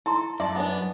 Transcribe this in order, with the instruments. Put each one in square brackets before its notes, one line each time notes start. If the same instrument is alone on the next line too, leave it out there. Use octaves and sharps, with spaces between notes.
[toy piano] E4 A#5 C6 [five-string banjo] A4
[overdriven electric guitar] F#2 [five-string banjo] D5 A5 [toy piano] E5
[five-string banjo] B3 C#4 D4